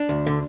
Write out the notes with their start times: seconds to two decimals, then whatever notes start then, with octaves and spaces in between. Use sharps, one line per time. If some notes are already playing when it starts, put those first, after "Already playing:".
Already playing: D4
0.09 D2
0.27 D3